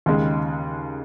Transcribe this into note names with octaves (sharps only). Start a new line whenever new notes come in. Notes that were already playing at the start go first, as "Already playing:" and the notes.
D#2 C#3 G#3